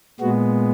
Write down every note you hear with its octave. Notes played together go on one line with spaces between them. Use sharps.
A#2 G#3 B3 F#4